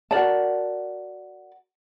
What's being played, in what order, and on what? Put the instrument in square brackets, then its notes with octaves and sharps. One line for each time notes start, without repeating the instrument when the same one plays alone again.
[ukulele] F#4 A#4 D5 A5